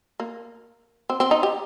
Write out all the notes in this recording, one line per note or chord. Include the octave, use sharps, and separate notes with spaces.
A#3
C4
C4
D#4
G4